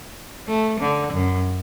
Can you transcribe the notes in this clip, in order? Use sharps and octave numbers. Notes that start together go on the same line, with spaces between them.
A3
D3
F#2